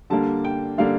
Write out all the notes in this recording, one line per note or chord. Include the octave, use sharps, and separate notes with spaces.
D3 G3 A#3 D4 A5
G5
D3 G3 A#3 D4 F5